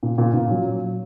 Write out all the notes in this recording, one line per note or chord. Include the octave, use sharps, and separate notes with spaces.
A#2
A#2
A#2
F#3